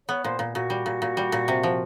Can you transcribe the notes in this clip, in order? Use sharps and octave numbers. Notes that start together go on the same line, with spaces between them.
B3 C#5
A#2 C5
A#2
A#2 F#4
G3
A#2
A#2
G3
A#2
C3
F3